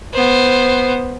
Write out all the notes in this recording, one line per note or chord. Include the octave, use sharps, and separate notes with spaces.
B3 C5